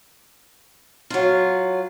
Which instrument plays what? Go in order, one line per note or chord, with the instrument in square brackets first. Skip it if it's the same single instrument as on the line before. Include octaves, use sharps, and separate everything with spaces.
[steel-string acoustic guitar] F#3 F4